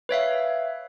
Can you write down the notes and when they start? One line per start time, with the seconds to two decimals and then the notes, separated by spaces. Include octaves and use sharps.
0.09 B4 C#5 E5 F5